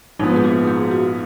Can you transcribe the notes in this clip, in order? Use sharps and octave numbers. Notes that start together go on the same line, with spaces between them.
A#1 G#2 F3 B3 D#4
G#4
F#4
G#4
F#4